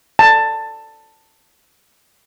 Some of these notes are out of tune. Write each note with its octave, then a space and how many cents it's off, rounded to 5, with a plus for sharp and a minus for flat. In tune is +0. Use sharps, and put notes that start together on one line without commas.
A5 +15